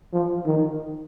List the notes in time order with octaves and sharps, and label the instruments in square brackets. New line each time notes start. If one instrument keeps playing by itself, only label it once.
[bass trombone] F3
D#3